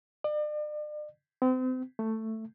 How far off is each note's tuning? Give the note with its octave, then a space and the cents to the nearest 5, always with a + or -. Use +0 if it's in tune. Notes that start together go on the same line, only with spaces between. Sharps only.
D5 +40
C4 -35
A3 +10